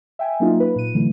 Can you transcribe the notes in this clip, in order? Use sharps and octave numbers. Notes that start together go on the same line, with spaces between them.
E5 G5 G#5
F#3 A#3 C#4 D#4 F4
B4
A#2 D#7
D3 E3 F#3 A3